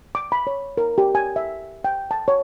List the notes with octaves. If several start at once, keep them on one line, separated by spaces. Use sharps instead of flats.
D6
B5
C#5
A#4
G4
G#5
E5
G5
A5
C#5